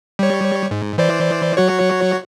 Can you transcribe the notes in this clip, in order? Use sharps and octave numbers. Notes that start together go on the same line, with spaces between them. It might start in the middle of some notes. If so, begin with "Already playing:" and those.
G3 C#5
G#2
E3 C5 D5
F#3 F#4 C#5